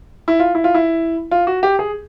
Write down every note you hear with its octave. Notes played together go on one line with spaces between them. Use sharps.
E4
F4
E4
F4
E4
F4
F#4
G4
G#4